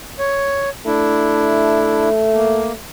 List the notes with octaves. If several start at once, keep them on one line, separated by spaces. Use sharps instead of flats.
C#5
A3 D4 E4
A#3